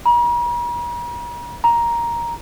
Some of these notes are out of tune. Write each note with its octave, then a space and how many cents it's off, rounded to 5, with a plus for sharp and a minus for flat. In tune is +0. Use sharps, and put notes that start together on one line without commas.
A#5 +45
A#5 +10